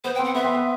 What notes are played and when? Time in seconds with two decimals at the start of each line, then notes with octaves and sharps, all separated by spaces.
0.04 B3 C5
0.15 G5
0.19 C4
0.24 F#5
0.35 B3 E5
0.44 C4
0.54 B3